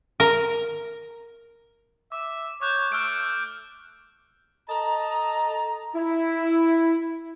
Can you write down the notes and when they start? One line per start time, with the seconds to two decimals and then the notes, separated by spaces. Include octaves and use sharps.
0.20 A#4
2.12 E5 D6
2.61 C#5 D6 F#6 G6
2.92 A3 F6 F#6 D7
4.69 A4 D#5 A5 A#5
5.95 E4